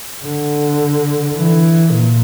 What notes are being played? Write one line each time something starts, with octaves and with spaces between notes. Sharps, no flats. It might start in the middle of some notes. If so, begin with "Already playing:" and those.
D3
E3
A#2